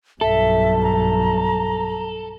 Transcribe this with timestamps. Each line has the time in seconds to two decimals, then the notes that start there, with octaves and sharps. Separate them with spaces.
0.21 B1 G2 A4 E5
0.83 A#5